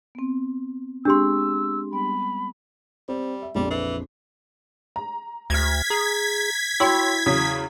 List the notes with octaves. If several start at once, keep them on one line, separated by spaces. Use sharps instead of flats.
B3 C4
G#3 C4 D4 G4 G#4 C6 E6
G3 B3 B5
G3 C4
E5
A#1 F2 G3
E3
A#5
D2 F6 G#6 A#6 B6
G#4 A#5
E4 F#4 C#5 G5 C6 E6
E2 C#3 F#3 D#6